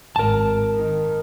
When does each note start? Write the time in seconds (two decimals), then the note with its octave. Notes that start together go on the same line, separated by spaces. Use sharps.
0.16 G#1 A#4 A5
0.74 D#3